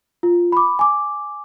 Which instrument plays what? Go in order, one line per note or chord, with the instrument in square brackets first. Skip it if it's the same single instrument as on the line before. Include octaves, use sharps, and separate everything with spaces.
[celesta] F4
B5 D6
G#5 D6